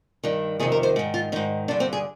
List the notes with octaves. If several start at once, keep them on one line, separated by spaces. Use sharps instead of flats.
G2 D#3
F2 C3 D#3 G#4
A#4
C5
G#2 D#3
F4
G#2 D#3 D#4
G2 D3 D4
C4
G#4